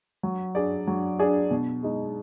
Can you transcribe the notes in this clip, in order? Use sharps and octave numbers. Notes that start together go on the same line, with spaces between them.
F#3
D4 G#4 D5
F#3
D4 G#4 D5
B2
G#3 D#4